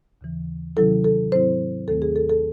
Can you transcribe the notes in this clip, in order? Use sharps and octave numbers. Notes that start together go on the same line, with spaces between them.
D#2 C#3 E3
C3 D#3 F#3 C#4 E4 A4
A4
G#2 F#3 C4 E4 C5
D#2 D#3 A3 C4 A4
G#4
A4
A4